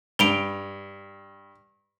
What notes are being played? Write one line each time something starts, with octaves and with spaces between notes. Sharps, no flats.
G2 D7 F7 G7